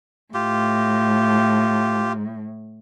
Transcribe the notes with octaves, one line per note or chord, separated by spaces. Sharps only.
A2 F4 G4